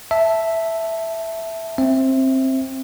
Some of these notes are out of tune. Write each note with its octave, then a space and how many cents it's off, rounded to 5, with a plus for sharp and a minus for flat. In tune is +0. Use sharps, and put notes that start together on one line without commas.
E5 +0 A5 +0
C4 +15 E5 +0